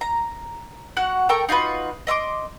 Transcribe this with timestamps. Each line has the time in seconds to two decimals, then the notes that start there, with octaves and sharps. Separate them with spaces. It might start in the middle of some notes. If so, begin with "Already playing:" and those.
0.01 A#5
0.97 F#4 F#5 F#6
1.29 A4 A#4 G5 C#6
1.49 D#4 F4 F#4 B4
2.07 D#5 E5 C6 D6